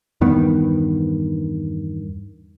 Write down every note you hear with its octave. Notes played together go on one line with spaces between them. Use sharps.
E2 G2 D#3 B3